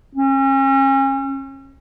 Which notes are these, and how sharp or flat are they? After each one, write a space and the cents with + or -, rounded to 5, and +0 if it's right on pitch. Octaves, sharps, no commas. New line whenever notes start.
C#4 -35